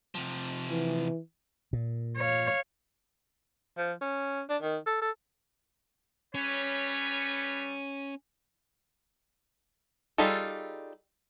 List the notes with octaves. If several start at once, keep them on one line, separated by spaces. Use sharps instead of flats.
C3 F3
E3
A#2
C#5 F5
F3
C#4
D4
D#3
A4
A4
G3 C#4 B4 C#5
G3 D#4 F4 G#4 A4